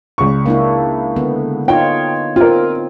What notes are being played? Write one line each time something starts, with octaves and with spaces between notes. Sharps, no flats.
C#2 C#6
A#3 D4 E4
D3 B3
D#4 F4 C#5 G5
C4 F4 A#4